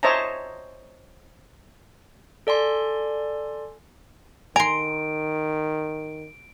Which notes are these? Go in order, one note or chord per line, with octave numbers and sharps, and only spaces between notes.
C5 C#5 D#5 E5 A5 A#5
A4 D5 G#5 C6
D#3 G#5 A#5 C6 D7